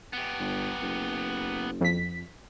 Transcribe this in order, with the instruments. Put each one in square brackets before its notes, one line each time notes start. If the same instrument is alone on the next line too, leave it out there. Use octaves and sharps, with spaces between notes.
[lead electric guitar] B3 G4
[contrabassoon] G1
F#1
[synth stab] F2 B6